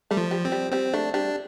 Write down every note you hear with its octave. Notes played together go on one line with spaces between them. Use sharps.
G3 A3
F3
G3
C4
G3
G3 C4
A3 D4
G3 D4